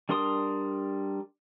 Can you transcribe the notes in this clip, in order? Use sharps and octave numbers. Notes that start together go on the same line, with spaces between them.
G3 D4 A#4 C6 D#6